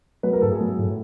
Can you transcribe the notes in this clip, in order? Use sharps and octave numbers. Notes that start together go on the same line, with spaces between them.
F#3 B4
A#4
A2 A4
G#4
F#3
A2